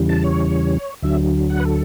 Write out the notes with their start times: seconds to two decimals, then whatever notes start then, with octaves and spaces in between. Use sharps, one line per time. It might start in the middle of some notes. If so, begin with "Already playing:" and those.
Already playing: E2 C#3 E3 G3
0.09 A5
0.24 C#5
1.02 D2 D3 F#3 E5
1.50 F#5
1.60 B4
1.65 A4